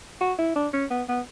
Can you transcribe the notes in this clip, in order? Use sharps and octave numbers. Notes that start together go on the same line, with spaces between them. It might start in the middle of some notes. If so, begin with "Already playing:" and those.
F#4
E4
D4
C#4
B3
B3